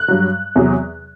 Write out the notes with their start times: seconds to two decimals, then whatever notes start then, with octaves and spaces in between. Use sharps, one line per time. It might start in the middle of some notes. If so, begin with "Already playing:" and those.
Already playing: F#6
0.08 G2 F#3
0.56 E2 C3 F#3